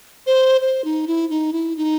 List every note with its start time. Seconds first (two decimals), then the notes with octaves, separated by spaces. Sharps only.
0.27 C5
0.61 C5
0.84 D#4
1.07 E4
1.30 D#4
1.53 E4
1.76 D#4